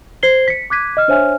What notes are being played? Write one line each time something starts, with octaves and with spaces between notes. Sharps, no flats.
C5 G#6 C7 G7
B6 C#7
D6 F#6 G#6 B6 D#7
D#5 F6
D4 C5 C#5 E5 G#5 F6